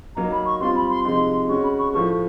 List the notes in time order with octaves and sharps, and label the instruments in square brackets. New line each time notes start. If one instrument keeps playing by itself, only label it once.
[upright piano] F#3 A#3 D#4 [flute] A#5
[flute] B5
C#6
[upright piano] G3 C4 F4 [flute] C6
[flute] B5
C6
[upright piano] C3 F3 G#3 C4 D#4 [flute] C6
[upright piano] G#3 C#4 F#4 [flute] C#6
[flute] B5
C#6
[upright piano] A2 F3 A3 [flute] C#6